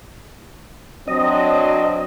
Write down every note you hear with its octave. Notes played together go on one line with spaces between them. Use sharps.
F#3 C4 D4 D#5